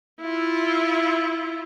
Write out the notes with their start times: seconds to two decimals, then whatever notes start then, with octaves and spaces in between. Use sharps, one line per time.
0.21 E4 F4